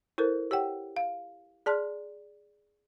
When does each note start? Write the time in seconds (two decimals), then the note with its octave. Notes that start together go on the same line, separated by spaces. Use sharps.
0.18 E4 A4 A#4 C5
0.51 G4 C#5 F#5 G5
0.96 F5
1.66 G#4 D5 A5 C6 F6 F#6